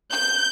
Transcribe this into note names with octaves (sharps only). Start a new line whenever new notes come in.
G6